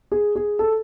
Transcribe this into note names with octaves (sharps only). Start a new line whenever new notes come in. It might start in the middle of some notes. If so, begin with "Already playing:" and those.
G#4
G#4
A4